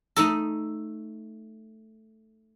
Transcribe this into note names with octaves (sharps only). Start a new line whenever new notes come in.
A3 D#4 A4